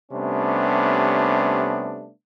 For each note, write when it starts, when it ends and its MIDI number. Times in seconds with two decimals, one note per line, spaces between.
0.12 2.10 48
0.12 2.10 55
0.12 2.10 57
0.12 2.10 59
0.12 2.10 61
0.12 2.10 62